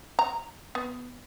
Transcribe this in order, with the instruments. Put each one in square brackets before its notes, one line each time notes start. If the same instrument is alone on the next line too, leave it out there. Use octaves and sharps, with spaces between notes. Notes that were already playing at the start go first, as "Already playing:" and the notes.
[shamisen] A#5
B3